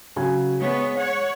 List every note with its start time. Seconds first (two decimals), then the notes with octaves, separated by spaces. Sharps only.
0.16 C#3 F#3 G#5
0.61 G#3 B3 C#5
0.98 C#5 F#5